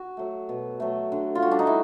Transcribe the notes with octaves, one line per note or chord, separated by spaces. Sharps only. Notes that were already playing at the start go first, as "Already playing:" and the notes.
Already playing: F#4
F#3 A3
B2
F#3 A3
D3
F4
G3 F#4
D4
D#4
E4